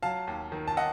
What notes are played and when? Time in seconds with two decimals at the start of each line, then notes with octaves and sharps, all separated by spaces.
0.03 F#3 F5 A5
0.27 D#2
0.52 D#3
0.68 A5
0.77 D#5 F#5